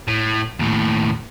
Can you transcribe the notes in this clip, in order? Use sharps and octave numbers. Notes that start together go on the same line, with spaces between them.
A2
D#2 A2